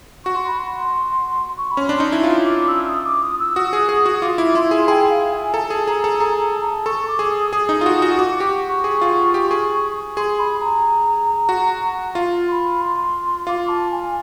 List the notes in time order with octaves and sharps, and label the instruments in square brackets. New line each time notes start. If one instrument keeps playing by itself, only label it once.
[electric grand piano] F#4 [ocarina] C#6
[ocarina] C6
B5
C6
C#6
B5
[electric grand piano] C#4 [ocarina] C6
[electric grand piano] D4
D#4
E4
F4
[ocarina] D6
E6
D#6
D6
D#6
E6
[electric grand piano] F#4 [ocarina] D#6
[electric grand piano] G#4
G#4
F#4
[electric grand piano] F4 [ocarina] D6
[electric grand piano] E4
[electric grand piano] E4 [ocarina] C6
[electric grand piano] G#4
[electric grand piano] G#4 [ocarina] G5
[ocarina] F5
G#5
[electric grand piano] A4 [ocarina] A5 A#5
[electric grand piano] G#4
[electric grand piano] G#4 [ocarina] A#5
[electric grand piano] A4
[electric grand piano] G#4 [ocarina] A#5
[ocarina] A5
A#5
A5
[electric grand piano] A4 [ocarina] C#6
[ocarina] D6
[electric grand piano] G#4
[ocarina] D#6
[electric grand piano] G#4 [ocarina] D#6
[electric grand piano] D#4
F4
F#4
F#4
[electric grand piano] F#4 [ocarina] D6
[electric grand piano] G4 [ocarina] D6
[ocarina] C#6
[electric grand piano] G#4
F4
G4
G#4
[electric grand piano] G#4 [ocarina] C6
[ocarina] B5
A#5
[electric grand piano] F#4
F4
[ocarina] C6
B5
C6
[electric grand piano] F4 [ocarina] D6
[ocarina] A5
G#5